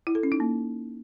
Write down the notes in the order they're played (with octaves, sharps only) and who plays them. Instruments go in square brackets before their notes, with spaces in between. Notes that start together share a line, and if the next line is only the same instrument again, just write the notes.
[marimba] E4
A4
C#4
D#4
A#3